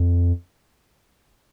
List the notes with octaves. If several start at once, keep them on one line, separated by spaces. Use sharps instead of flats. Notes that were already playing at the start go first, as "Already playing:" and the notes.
Already playing: F2